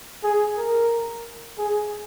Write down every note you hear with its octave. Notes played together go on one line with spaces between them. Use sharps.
G#4
A#4
G#4